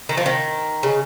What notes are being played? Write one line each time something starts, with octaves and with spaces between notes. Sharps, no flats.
D#3
F3
D#3
C#3